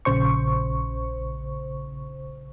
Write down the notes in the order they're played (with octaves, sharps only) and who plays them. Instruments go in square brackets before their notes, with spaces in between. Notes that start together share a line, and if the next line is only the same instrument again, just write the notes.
[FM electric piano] A#1 C#3 C5 C#6